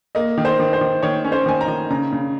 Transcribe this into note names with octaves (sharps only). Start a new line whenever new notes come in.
A#3 D#5
D#3
C5
D#3
C5
D#3
D#3 C#5
C#4
C5
D#3 G#5
A#5
D#3
C#3 A#5
C#3